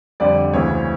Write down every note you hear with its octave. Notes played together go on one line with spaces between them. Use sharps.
F2 D3 G3 D5
D2 C#3 E3 G#3 C4 C#5